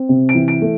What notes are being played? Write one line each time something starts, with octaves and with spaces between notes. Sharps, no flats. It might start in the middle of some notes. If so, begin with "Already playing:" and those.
Already playing: C4
C3
D7
E3
D7
A3